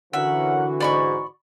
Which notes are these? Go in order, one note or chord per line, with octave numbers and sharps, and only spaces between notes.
D3 E3 C#4 F#4 A#4 E5 F#5
G#2 D5 B5 C#6